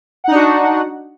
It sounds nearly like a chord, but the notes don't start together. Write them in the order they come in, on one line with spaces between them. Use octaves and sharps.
F#5 D#4 D4 F#4